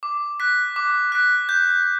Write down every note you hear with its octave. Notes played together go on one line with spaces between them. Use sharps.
D6
F#6 B6
D6
F#6 B6
G6